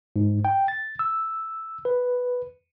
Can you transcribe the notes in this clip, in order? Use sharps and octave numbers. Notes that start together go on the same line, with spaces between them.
G#2
G5
A6
E6
B4